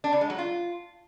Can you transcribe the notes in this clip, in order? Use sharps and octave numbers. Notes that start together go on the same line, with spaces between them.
D4
C#3
G#3
F#3
F4